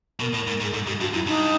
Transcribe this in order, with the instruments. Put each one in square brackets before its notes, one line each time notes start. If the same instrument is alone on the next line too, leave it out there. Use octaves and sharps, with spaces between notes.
[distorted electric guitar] B2 [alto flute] A#4
[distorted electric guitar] A2
[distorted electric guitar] G#2 [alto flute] A#4
[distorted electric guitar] G#2 [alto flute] G#4
[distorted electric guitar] G#2 [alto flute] A4
[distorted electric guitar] G#2 [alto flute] G4
[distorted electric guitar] G2 [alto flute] F#4
[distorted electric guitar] F#2 [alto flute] E4
[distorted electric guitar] G2 [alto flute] D#4